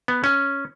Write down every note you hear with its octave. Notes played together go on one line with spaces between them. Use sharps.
B3
C#4